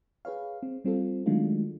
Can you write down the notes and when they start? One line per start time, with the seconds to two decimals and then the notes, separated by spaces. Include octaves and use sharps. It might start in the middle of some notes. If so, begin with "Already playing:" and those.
0.25 G#4 B4 C#5 F5
0.63 C4
0.85 G3 C4 F4 A4
1.26 D#3 F#3 G#3 A3 D4 F4